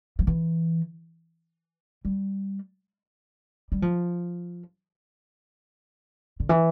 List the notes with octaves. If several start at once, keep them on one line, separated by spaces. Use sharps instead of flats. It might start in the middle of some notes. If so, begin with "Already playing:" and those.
F3
E3
G3
G3
F3
D3
E3